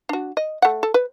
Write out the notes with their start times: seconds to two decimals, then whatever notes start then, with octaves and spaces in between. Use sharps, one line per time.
0.09 D4 F#4
0.37 D#5
0.62 A3 F#5
0.83 A4
0.94 B4